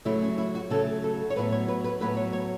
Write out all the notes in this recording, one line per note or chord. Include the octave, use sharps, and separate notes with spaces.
C#3 F#3 A3 E4
C#4
E4
F#4
C#3 F#3 A3 A4
A4
C#5
A2 F#3 B3 B4
C#5
B4
B4
A2 F#3 B3 B4
C#5
C#5